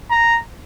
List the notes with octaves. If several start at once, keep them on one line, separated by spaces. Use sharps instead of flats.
A#5